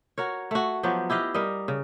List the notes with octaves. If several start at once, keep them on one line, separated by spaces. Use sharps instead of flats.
F#4 A#4 C#5
A3 F#4
F3 F#3 B3 G4
E4 G4 D#5 F5
G3 A#4 D#5
C#3